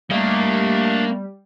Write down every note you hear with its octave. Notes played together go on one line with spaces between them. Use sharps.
G3 A3 A#3 D4 D#5